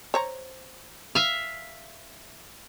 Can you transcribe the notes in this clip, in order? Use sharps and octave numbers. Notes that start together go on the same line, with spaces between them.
C5 C#5 A#5
E5 F5